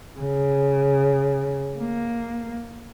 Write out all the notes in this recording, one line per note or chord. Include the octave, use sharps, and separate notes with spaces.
C#3
A#3